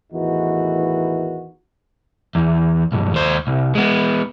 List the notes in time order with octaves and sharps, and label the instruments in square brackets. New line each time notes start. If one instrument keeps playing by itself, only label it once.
[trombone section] A1 E2 D#3 E3 D#4 F#4
[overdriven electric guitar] E2
B1 G2
D#2 C5
C2
G#3 B3